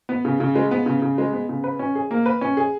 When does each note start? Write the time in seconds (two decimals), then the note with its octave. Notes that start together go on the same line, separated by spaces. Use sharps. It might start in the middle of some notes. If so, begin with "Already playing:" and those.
0.09 B3
0.25 C#3
0.40 C#3
0.55 G#3
0.71 B3
0.86 C#3
1.02 C#3
1.18 G#3
1.33 B3
1.49 C#3
1.64 B4
1.79 C#4
1.95 G#4
2.11 A#3
2.26 B4
2.41 C#4
2.57 G#4